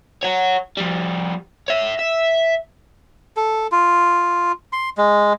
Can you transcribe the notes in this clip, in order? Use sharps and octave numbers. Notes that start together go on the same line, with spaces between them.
C#5 F#5
F3 G3
C#5 E5
E5
A4
F4
C6
G#3